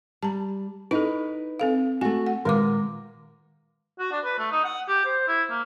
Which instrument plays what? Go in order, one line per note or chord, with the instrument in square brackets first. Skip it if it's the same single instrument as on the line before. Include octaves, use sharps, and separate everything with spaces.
[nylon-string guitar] G3 [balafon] A5 A#5
[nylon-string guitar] D#4 B4 [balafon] E4 A4
[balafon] C4 A4 F5
[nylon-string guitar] A3 F#4 [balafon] G#5
[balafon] F#5
[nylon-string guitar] A#2 A#4 [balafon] D#3 G#3 D6
[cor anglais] F#4
D4
B4
A3
D#4
F#5
G4
C5
E4
A#3